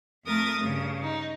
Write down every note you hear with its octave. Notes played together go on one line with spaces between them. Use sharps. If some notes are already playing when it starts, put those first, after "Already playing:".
F2 A3 A#4 D#6 A6
G2 C#3
D#4